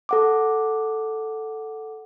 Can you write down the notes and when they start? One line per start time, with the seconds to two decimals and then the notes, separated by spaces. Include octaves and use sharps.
0.09 A4 F#5 D6